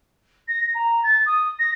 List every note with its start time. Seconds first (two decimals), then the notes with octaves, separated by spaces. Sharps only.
0.48 A#6
0.75 A#5
1.04 A6
1.26 D#6
1.59 A#6